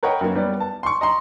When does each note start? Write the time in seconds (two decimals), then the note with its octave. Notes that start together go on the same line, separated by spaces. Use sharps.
0.03 A#4 B4 C#5 D#5 F#5 G5
0.21 F#2 A#3
0.35 G3 B3 D5
0.60 A5
0.83 C6 C#6
1.01 D#5 A#5 C6